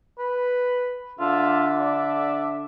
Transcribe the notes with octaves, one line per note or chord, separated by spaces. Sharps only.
B4
D3 D4 F4 E5
D5